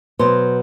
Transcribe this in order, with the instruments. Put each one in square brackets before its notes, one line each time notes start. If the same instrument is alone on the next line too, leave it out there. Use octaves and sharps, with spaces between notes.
[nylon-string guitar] B2 F#3 C5